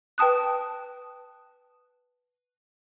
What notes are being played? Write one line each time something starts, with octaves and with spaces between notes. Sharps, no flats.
B4 G5 A5 D#6 F#6